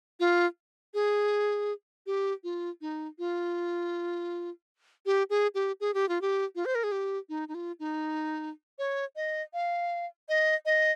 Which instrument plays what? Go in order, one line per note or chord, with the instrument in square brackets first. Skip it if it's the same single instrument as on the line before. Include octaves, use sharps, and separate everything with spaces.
[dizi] F4
G#4
G4
F4
D#4
F4
G4
G#4
G4
G#4
G4
F4
G4
F4
C5
A#4
G#4
G4
D#4
D#4
F4
D#4
C#5
D#5
F5
D#5
D#5